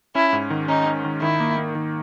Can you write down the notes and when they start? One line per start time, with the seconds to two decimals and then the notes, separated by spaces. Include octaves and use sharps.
0.15 C#4 E4
0.33 G#2
0.50 D#3
0.68 C#4 D#4
0.86 C#4
1.05 D#3
1.22 D#3 E4
1.40 A#3
1.57 A#3
1.75 D#3